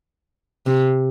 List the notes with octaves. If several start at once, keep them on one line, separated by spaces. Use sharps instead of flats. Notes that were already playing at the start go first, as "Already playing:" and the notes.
C3